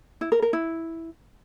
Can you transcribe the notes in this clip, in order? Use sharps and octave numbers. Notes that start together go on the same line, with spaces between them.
E4
A#4
A#4
E4